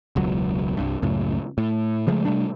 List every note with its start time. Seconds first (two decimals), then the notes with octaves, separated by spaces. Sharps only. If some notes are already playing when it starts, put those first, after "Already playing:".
0.16 E1 C#2 F#3
0.77 C2 G2
1.02 C#2 F#2 A2 C#3
1.58 A2
2.07 C#3 F3 G#3 A3
2.25 C3 G3 A3 D4